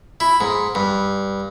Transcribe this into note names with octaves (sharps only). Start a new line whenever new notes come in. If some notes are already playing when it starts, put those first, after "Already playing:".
E4
G#2
G2